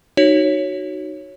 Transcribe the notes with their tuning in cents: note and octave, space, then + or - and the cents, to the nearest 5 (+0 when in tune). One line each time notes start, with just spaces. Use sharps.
D#4 -15 F#4 +10 C#5 +0